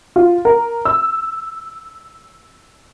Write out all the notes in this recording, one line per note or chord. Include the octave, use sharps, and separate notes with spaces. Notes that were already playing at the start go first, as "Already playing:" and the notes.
F4
A#4
E6